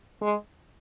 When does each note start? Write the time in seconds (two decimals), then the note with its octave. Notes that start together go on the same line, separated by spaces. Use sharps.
0.22 G#3